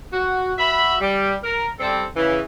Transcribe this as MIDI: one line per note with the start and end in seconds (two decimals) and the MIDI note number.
0.12 0.51 66
0.58 0.95 66
0.58 0.95 76
0.58 0.95 83
1.00 1.34 55
1.43 1.67 70
1.80 2.04 55
1.80 2.04 60
1.80 2.04 69
2.15 2.39 49
2.15 2.39 52